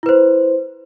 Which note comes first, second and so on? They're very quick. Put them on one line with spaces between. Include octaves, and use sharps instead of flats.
E4 B4 C5